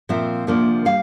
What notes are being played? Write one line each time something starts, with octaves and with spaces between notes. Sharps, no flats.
A#2 F3 C4 E5
D2 C3 F3 A#3 D4
E3 G3 F5